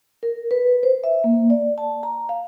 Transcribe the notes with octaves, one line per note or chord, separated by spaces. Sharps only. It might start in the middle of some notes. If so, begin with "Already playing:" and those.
A#4
B4
C5
E5
A#3
D5
A5
A#5
F5